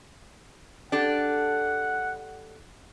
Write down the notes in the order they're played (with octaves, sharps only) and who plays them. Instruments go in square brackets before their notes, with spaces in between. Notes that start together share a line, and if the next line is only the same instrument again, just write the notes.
[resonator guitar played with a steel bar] D4 G4 A4 [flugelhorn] F#5